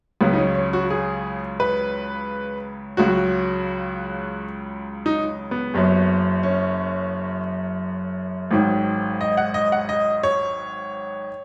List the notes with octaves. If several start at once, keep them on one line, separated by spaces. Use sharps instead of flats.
C#2 C#3 F#3 B3
D#4
C#4
C#4
F#4
G#4
B4
C#2 C#3 F#3 F#4
D#4
B3
F#1 F#2 F#3
C#4
G#1 G#2 D#3 F#3
D#5
F#5
D#5
F#5
D#5
C#5